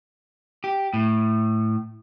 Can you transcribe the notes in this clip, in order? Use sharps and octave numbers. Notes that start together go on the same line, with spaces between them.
G4
A2